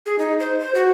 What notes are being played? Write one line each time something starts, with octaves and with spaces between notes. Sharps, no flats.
G#4
D#4
C5
C5
F#4